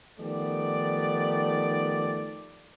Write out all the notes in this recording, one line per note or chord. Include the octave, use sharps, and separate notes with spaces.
D#3 F3 A3 B3 G4 D5